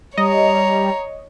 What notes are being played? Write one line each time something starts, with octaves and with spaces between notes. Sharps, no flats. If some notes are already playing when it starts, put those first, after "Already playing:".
G3 C#5 D#5 A#5